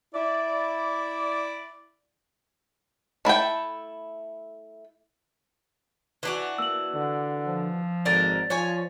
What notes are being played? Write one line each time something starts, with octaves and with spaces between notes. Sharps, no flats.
E4 D5
A3 E4 A4 G5
E3 D4 F#4
A#3 E6 F#7
D3
F3
G#1 D3 A#4 D5 A6
F3 C#5 G#5